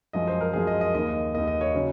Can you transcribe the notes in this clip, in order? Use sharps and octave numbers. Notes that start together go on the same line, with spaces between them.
F#2 F3 G#3 D#5
C5
A#4
F#2 F3 G#3 G#4
D#5
D#5
D#2 D#3 A#3 D#5
D#2 D#3 A#3 D#5
D#5
C#5
C#3 F#3 C#4